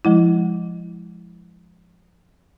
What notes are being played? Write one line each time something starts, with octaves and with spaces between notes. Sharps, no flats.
F3 G#3 E4